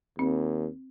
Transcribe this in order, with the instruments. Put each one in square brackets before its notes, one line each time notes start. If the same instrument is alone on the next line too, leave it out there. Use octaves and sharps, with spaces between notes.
[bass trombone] D#2 [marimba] C4